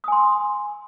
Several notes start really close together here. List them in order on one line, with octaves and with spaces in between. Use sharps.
D#6 G#5 C6